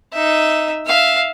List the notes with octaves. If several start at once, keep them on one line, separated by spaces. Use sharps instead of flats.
D#4 E5
E5 F5